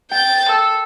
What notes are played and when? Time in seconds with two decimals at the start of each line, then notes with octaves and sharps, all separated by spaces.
0.11 G5 G6 A6
0.49 A4 E6